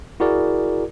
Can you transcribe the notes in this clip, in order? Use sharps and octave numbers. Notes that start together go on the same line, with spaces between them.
E4 F#4 G#4 A#4 D5